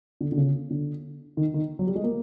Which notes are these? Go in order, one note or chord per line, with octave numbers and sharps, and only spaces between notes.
D3
D3
C#3
D3
D#3
D#3
F#3
G3
G#3
A#3